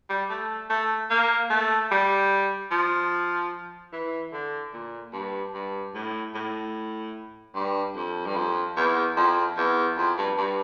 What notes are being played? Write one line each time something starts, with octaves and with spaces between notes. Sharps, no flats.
G3
A3
A3
A#3
A3
G3
F3
E3
D3
A#2
G2
G2
A2
A2
G2
F2
G2
F2
E2
F2
E2
F2
G2
G2